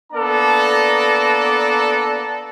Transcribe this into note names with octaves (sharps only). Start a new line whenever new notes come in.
A#3 B3 D4 A4 D5 A#5